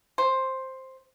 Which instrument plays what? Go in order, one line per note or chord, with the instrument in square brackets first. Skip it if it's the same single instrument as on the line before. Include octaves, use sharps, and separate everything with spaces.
[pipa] C5